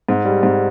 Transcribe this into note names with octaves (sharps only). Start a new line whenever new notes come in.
G#2
G3
G#2